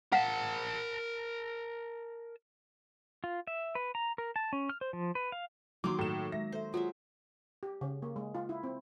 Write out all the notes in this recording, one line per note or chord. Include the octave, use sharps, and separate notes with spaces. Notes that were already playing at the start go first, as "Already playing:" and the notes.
A#4 F5 F#5 A5
F4
E5
B4
A#5
A#4
A5
C#4
F6
C5
F3
B4
F5
D#3 F#3 A#3 C6 D6
A2 E7
G#3 E5 A#6
A4 C5 E5
F#3 G#3 F4 E5
G4
C#3
A#3
G#3
F4
E4
C4